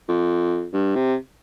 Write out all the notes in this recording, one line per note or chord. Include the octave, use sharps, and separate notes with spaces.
F2
G2
C3